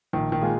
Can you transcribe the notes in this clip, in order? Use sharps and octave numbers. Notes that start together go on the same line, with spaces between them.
A#1 D#3
D#3
A#2 G#3 F4 G#4